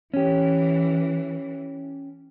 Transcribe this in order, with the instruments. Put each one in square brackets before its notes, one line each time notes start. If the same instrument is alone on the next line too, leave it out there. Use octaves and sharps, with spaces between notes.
[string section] E3 [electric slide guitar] C#4 G4